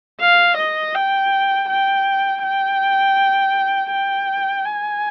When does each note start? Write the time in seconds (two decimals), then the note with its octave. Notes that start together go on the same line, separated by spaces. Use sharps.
0.21 F5
0.58 D#5
0.95 G5
1.69 G5
2.43 G5
3.91 G5
4.65 G#5